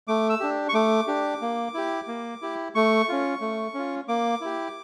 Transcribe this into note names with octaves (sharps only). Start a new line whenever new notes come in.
A3 D6
E6
D4 G4
C#6
A3 D6
D4 G4
A#3
E4 G4
A#3
E4 G4
A3 C#6
C#4 F4
A3
C#4 F4
A#3 D6
E4 G4